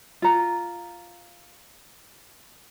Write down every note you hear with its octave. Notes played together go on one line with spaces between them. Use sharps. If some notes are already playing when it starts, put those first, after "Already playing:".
F4 A#5